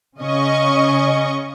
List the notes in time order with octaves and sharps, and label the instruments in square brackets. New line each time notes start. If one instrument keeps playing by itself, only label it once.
[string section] C#3 C#4 D#5 C#6